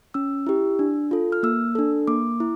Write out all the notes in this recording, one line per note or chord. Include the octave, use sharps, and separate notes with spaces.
C#4 E6
E4 G4
D4
F4 A4
F6
A#3 E6
D4 A4
A#3 D6
E4